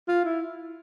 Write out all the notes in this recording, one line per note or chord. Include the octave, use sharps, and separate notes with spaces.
F4
E4